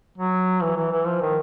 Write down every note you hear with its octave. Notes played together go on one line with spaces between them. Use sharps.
F#3
E3
E3
E3
F3
D#3